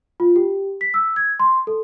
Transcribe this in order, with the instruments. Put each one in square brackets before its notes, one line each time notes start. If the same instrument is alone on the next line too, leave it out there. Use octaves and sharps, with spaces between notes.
[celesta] F4
G4
B6
E6
G#6
C6
A4